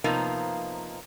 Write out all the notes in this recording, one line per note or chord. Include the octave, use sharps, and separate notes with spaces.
C3 F3 A#3 B3 D#4